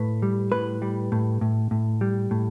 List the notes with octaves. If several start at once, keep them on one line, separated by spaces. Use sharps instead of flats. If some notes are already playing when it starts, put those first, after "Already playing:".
Already playing: A2 B4
G3
A2 B4
G3
A2
A2
A2
G3
A2